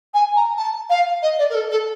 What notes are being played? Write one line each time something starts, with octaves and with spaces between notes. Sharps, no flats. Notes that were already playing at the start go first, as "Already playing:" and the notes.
G#5
A#5
A5
F5
D#5
D5
A#4
A4
A4